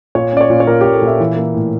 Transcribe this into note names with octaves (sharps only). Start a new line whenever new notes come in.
A#2 C#5
C#4 D5
C#5
A#2
C#5
A#2 A#4
G4
A#2
A4
A#2
E5
E3
A#3
A2